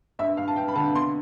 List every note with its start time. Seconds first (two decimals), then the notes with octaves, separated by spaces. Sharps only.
0.19 G2 E5
0.37 G2 F5
0.48 A5
0.56 G2 G5
0.68 B5
0.75 D3 A5
0.94 B2 C6